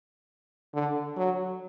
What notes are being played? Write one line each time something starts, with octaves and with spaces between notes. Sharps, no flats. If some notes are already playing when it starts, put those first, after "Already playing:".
D3
F#3